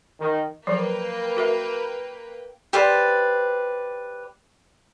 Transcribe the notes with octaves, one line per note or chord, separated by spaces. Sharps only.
D#3
F3 F#3 A#3 B4 G5
F#4 A#4 E5
G4 B4 C5 D5